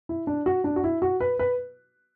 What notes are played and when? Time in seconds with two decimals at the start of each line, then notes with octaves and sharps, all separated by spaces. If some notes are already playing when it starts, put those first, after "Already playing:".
0.09 E4
0.27 D4
0.46 F#4
0.64 D4
0.76 F#4
0.84 E4
1.02 F#4
1.20 B4
1.39 B4